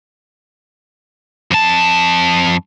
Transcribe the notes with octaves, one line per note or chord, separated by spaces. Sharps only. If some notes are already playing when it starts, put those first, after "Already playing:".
F2 A5